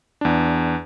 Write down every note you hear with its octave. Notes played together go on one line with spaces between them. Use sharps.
E2 D4